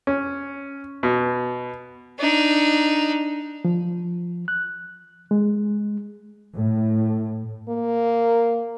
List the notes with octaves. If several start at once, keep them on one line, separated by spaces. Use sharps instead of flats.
C#4
B2
D4 D#4
F3
F#6
G#3
A2
A#3